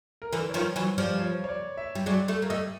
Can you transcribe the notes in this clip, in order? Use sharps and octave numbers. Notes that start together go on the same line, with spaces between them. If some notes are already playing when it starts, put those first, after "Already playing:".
A#4
D3 E3 B4
C#5
D#3 F3 C5
E3 F#3 C#5
F3 G3 D5
C#5
C#5
D5
E5
G3
F#3 G#3 D5
G3 A3
A#3
G3 A3 D#5